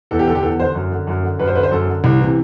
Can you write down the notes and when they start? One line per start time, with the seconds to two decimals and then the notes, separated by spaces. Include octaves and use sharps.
0.11 E2 A4
0.19 G4
0.27 D3 A4
0.35 G4
0.43 E2 A4
0.59 D3 C5
0.75 F#2
0.92 D3
1.07 F#2
1.23 D3
1.39 F#2 B4
1.48 C5
1.55 D3 B4
1.63 C5
1.71 F#2 A4
1.87 D3
2.04 C2
2.19 C3 E3